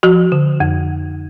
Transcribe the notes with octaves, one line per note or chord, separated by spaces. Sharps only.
F3 F#4
D3
F2